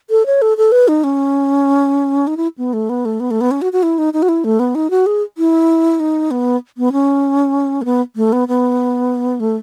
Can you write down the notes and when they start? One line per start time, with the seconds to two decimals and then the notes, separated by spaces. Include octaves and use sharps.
0.10 A4
0.26 C#5
0.42 A4
0.57 A4
0.72 B4
0.88 D#4
1.04 C#4
2.27 D#4
2.37 E4
2.58 B3
2.73 A3
2.89 B3
3.05 A3
3.20 B3
3.31 A3
3.41 B3
3.51 C#4
3.62 F#4
3.73 F#4
3.83 E4
3.98 D#4
4.13 D#4
4.22 F#4
4.29 E4
4.44 A3
4.59 B3
4.75 D#4
4.90 F#4
5.06 G#4
5.38 E4
6.00 D#4
6.31 B3
6.78 B3
6.92 C#4
7.82 A3
7.85 B3
8.16 A3
8.33 B3
8.48 B3
9.40 A3